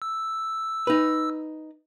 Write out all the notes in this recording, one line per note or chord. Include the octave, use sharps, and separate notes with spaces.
E6
D#4 B4